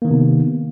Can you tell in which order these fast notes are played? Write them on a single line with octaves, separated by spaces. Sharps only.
A#3 D#3 B3 C3